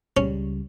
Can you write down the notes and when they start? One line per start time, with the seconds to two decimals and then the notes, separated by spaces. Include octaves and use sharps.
0.17 C#2 C#3 G3 C#4